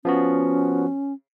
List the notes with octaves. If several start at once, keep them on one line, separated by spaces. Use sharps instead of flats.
F3 B3 C#4 F#4